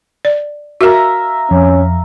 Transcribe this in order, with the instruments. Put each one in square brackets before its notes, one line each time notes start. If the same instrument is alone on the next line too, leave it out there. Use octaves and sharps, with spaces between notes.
[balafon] D5
[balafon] F#4 A#4 [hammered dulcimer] E5 F5 A#5
[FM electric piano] F2 [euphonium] C#4